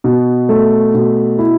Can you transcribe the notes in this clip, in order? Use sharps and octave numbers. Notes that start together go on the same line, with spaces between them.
B2
A3
B2
E4